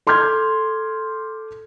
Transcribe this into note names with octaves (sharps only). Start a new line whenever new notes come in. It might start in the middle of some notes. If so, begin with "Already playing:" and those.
A4 C6 D6 F6 G6 G#6